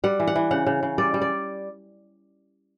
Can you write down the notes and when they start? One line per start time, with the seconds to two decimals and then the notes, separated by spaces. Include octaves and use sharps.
0.04 G3 F#5
0.20 E3
0.27 F#5
0.36 E3
0.51 C#3 F#5
0.66 C#3
0.83 C#3
0.98 G3 D5
1.14 G3
1.22 D5